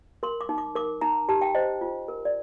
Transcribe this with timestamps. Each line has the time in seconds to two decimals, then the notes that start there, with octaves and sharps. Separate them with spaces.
0.23 A#4 C6
0.41 D6
0.49 D#4
0.58 D6
0.76 A#4 D6
1.01 D#4 A#5
1.29 G4 A5
1.41 G5
1.55 C5 D#5
1.81 F4
2.08 A#4
2.25 D5